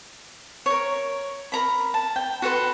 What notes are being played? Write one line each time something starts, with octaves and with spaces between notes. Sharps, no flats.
A#4 C#5
A#4 A#5 B5
A5
G5
F#4 A4 B4 C6